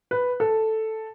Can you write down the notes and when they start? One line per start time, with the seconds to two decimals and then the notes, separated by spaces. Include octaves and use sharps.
0.11 B4
0.40 A4